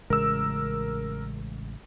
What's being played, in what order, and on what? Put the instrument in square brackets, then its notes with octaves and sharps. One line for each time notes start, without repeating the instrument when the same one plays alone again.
[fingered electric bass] A1 C#3 G#3 [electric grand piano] A#4 E6